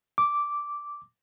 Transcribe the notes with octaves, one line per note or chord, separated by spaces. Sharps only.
D6